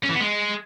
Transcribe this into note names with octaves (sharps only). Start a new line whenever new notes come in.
C#4
E3
B3
G#3